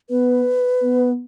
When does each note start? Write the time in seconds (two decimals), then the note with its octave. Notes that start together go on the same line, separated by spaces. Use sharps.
0.09 B3 B4
0.81 B3